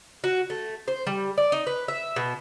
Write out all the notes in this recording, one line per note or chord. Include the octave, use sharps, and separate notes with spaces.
F#4
A3
C5
G3
D5
D#4
B4
E5
B2